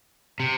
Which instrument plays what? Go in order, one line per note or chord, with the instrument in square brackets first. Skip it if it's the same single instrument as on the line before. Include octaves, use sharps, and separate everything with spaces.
[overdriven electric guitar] C3